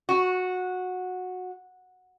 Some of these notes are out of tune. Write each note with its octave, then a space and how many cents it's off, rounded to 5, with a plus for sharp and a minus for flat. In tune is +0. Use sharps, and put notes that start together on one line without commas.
F#4 -15